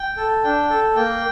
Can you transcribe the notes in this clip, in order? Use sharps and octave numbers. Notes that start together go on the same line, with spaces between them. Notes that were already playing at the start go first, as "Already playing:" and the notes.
Already playing: G5
A4
D4 G5
A4
A#3 G5